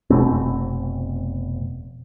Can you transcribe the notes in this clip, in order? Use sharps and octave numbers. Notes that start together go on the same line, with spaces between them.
F1 B2 A3 C4